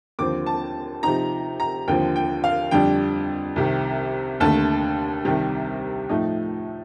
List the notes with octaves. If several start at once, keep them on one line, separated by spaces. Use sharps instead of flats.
D#2 D3 F3 C4 D6
A5
C3 F3 C4 D#4 A#5
A#5
D#2 D3 F3 C4 G5
G5
F5
F2 D3 G3 D4 G5
C2 C3 D#3
D#2 D3 A3 A5
C2 C3 D#3 G3
A2 F3 A3 D#4